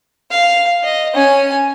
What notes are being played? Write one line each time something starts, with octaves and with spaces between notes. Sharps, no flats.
F5
D#5
C#4 G#5